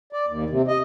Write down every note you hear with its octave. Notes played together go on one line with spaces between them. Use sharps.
D5
D#2
C3
D#5